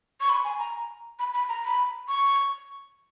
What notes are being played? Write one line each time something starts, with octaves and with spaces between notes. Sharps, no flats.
C#6
B5
G#5
A#5
B5
B5
A#5
B5
C#6